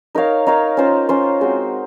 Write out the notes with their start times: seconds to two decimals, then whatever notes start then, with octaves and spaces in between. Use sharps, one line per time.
0.15 D#4 A#4 C#5 F5
0.47 D#4 A#4 C#5 F5
0.77 C#4 F4 C5
1.09 C#4 F4 C5
1.41 G#3 C4 F#4